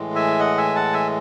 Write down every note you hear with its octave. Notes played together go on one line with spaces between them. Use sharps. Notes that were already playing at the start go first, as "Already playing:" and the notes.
Already playing: A2 E3 G#3
E5 G#5
D#5 F#5
E5 G#5
F#5 A5
E5 G#5